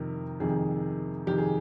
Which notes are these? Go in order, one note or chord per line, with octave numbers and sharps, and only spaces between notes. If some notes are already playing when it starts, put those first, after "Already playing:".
Already playing: F2 C3 D#3 A#4
F2 C3 D#3 G#4
F2 C3 D#3 G4
G#4